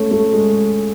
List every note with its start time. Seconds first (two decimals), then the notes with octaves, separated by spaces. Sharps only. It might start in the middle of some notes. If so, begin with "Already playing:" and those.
Already playing: A3 C#4
0.11 A3
0.33 G#3